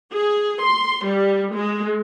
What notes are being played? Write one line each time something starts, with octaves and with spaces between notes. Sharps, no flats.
G#4
C6
G3
G#3